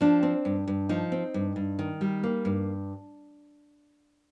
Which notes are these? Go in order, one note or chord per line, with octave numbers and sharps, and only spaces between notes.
F3 D4
C4
G2
G2
F3 D#4
C4
G2
G2
D#3
G3
A#3
G2